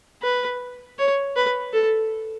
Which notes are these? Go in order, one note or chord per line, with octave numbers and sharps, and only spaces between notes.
B4
C#5
B4
A4